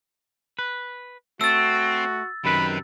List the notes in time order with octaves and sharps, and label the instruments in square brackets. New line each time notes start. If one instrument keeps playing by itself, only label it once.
[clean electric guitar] B4
[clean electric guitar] A3 [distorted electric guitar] C4 [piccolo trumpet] F#4 [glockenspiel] E6 A6
[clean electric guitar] F#2 D#3 B4 [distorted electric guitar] C3 [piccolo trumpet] B5